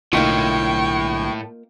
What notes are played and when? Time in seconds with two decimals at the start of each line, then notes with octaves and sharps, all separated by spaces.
0.13 B1 A2 D3 A#3 D#4 F4 G5 C#6